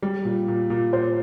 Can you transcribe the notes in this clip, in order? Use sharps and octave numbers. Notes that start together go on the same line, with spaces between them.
G3
A#2
A#2
A#2
A#2 C5